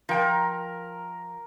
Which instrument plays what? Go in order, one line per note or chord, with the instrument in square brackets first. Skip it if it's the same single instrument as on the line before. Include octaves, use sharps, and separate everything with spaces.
[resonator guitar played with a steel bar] F3 G5 [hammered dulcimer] A#4